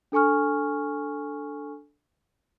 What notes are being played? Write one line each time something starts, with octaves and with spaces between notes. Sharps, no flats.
D4 A4 G#5 C#6 F6